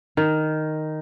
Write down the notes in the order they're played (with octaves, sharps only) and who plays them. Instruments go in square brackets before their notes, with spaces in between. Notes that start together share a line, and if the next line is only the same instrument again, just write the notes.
[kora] D#3